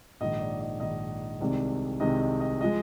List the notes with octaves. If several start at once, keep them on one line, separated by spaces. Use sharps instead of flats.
A#1 G#2 D#3 D#5
D5
D#5
A#1 G#2 D#3 D#5
C2 C3 D#3 G#3 D5
C2 C3 D#3 G#3 D#5
D#5
D#5
F3 G#3 D#5